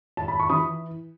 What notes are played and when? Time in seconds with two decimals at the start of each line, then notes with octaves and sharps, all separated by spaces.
0.17 A5
0.28 B5
0.40 C#6
0.50 E3 B5 D#6